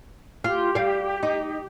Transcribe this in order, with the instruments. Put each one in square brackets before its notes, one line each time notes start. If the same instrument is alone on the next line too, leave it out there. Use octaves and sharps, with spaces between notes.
[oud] F4 [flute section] G4
[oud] G3 F5
D#4